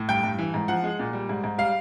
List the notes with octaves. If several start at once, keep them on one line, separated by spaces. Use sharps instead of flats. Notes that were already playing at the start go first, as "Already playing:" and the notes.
Already playing: A2
G2 G5
G2
E3
G#2
F3 F#5
G#3
A#2
G3
G#2
G#2
G3 F5